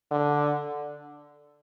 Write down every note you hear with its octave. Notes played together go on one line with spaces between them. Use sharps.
D3